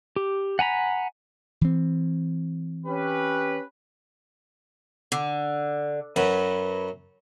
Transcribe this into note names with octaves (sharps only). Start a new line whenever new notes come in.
G4
F#5 G#5 A#5 B5
E3 C4
C#4 G4 B4
D3
F#2 F#3 B4